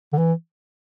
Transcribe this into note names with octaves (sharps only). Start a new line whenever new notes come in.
D3
E3